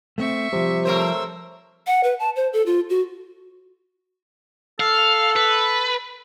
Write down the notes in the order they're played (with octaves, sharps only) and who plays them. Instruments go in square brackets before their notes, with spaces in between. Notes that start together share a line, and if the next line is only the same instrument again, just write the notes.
[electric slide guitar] A3 B3 C4 [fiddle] E5 C#6
[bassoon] C3 [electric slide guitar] F3 G3
[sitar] A3 A#4 C5 [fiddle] C#5 E6
[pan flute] F#5
B4
A5
C5
A4
F4
F#4
[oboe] A4 [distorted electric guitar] F5
[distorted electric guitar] B4